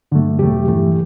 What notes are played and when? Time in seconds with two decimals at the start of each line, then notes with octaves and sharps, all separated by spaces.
0.12 G2 D3 F#3 A3
0.39 E2 B2 F#3 A3 G4
0.67 G2 E3 A3